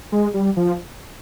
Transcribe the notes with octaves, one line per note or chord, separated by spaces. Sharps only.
G#3
G3
F3